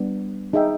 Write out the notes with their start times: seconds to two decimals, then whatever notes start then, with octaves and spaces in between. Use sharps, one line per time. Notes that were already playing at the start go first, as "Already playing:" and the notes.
Already playing: G3 B3 D4
0.53 D#4 G#4 B4 E5 G5